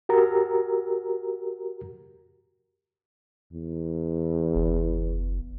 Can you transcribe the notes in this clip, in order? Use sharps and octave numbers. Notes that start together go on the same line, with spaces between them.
F#4 G4 A#4 A#5
E2
F#1